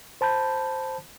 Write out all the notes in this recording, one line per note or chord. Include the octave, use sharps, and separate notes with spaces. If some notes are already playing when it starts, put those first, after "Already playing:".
C5 A5 B5 G6